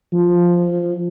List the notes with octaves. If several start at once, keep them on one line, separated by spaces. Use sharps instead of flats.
F3